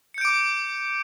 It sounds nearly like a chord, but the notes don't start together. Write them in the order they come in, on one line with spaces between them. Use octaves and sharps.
C#7 G6 D7 D6